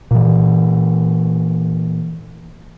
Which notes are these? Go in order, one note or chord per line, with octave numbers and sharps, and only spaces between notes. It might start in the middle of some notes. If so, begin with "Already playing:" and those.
A#2 E3